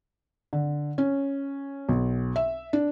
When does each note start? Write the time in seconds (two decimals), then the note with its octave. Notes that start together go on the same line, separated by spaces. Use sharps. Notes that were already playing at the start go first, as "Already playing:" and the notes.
0.53 D3
0.98 C#4
1.89 B1
2.36 E5
2.73 D4